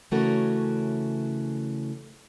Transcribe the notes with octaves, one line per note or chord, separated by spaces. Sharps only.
C#3 E3 A3 C#4 F#4 A#4